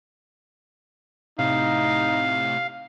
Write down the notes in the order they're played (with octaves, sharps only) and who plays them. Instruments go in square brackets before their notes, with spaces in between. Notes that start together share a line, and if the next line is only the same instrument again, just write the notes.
[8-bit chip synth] A2 C3 [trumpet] D#4 [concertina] F5